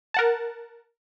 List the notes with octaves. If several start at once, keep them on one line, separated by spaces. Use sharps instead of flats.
A#4 F#5 A5